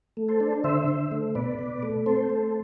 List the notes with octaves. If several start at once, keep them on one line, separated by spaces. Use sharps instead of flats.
A3
A4 C5
D4
D3 C5 E5
D3
A3
B2 B4 D5
B2
A3
C4 A4 C5
A3